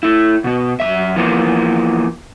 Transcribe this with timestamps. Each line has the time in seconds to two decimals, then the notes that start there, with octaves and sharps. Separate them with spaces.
0.03 A3 E4
0.44 B2 B3
0.80 F#2 D#3 E5
1.16 E3 F3 A#3 B3